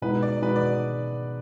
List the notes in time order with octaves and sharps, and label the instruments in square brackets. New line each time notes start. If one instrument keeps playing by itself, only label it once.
[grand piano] B2 G#3 D#4 F#4 [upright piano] B4
[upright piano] D5
[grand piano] B2 G#3 D#4 F#4 [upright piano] B4
[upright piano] D5